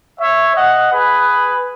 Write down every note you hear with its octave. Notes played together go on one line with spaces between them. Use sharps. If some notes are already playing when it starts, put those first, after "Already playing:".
C#5 E5
D#5 F#5
G#4 B4